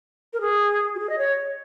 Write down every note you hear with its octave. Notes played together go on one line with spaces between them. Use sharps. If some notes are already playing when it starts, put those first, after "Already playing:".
A#4
G#4
F#4
G#4
D#5
C#5